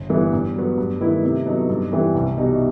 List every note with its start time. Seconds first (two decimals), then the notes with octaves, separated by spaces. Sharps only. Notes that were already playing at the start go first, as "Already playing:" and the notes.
Already playing: G1
0.10 G2 E3 B3
0.33 G2
0.55 F#3 B3
0.78 G2
1.00 D#3 A3 E4 B4
1.23 C3
1.46 F#3 B3 D#4 A4
1.70 G2
1.92 E3 G3 C4
2.14 C2
2.38 B2 G3 D#4